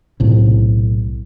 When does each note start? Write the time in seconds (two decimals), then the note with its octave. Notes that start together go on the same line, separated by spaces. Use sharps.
0.20 B1 A2 C3